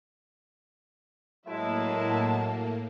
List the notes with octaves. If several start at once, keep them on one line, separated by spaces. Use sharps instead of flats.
A2 F#3 G#3 A#3 E4 E5 A5